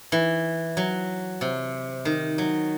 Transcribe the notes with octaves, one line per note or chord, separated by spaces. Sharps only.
E3
F#3
C3
D#3
F#3